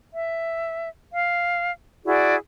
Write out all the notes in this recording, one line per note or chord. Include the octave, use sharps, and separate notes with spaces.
E5
F5
E4 F#4 G#4 D5